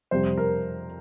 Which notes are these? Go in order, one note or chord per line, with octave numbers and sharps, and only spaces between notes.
F2 C3 G3 C5
A#4